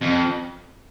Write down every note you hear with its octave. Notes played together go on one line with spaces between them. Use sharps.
F2